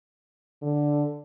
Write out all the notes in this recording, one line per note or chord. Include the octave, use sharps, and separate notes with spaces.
D3